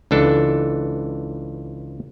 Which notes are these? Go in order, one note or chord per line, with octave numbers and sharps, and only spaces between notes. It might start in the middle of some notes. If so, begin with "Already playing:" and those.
C#2 E3 D4 A4